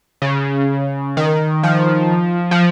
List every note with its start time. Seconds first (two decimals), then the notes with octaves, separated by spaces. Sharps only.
0.22 C#3
1.17 D#3
1.63 F3
2.51 F3